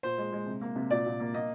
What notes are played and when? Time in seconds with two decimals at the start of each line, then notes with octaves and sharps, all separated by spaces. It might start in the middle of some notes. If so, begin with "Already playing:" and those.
0.03 A#2 C5
0.18 G#3
0.32 G#3
0.47 C3
0.61 A#3
0.76 C3
0.91 A#2 D5
1.06 A#2
1.20 A#3
1.34 A#3 D#5